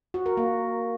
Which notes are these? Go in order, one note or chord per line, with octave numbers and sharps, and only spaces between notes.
F#4
A#4
A#3